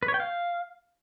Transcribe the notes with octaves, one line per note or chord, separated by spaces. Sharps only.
B4
C#5
G5
F5